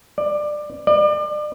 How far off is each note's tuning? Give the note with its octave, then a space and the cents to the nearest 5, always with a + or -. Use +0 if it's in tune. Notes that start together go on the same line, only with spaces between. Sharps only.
D5 +20
D5 +35